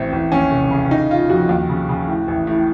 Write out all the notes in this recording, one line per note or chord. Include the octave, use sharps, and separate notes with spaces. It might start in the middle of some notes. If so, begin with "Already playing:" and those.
Already playing: A1 A2 C4
A1
D#2 C#4
F1
C#3
D#3 D#4
D#3 F4
F2 F#4
D#2
C#3
C#3
A2
A1
A2